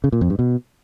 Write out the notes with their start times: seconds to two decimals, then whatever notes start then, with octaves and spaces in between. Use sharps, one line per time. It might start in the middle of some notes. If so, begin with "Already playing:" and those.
0.04 C#3
0.12 A#2
0.21 F2
0.30 G2
0.39 B2